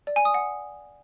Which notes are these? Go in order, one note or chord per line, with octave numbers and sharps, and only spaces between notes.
D5
G#5
D#6
F#5